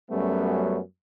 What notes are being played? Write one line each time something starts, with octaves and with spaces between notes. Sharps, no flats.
F#2 F#3 G3 A3 B3 C#4